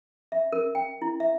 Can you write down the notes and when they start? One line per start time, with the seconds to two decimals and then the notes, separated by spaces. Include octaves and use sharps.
0.32 E5
0.52 A#4
0.75 G5
1.02 E4
1.20 E5